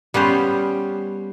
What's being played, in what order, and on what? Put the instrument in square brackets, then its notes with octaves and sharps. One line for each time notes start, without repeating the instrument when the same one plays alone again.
[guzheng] G3 B3 C#4 C5